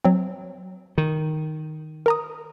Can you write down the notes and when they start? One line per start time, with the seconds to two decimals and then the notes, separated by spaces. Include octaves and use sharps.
0.05 F#3 C4
0.98 D#3
2.06 A#4 A#5 D#6